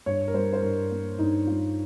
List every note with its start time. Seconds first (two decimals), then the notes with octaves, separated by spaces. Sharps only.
0.06 G2 C#5
0.28 A#4
0.34 G3 C5
0.53 C5
0.62 G2 A#4
0.91 A#3
1.19 G2 D#4
1.47 G3 F4